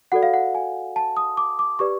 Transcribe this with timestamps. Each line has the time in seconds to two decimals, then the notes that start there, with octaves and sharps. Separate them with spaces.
0.12 F#4 A4 D5 F#5
0.23 F5
0.34 F#5
0.55 G#5
0.96 A5
1.17 D#6
1.37 D6
1.59 D6
1.79 G4 B4 D5 C#6